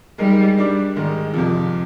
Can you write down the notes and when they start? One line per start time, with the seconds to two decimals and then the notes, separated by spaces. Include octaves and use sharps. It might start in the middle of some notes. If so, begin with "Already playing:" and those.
0.18 G3 G#3 D#4 A#4 D#5
0.58 G3 D4 G4 D5
0.96 G#2 D#3 G#3 D#4
1.34 F2 C3 F3